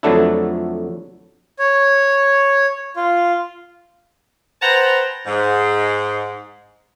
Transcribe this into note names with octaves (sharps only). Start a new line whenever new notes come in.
F2 D3 F#3 A3 D4 E4
C#5
F4
B4 C5 F#5 G5 A5 A#5
G#2